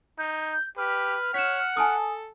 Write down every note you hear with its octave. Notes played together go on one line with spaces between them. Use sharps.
D#4 G6
G4 B4 F6
C#5 F#5 B6 E7
A4 G#5 A5 D#6